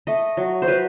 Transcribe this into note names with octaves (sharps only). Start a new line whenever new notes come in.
A3 D#5
F#3
C5
F#3 B4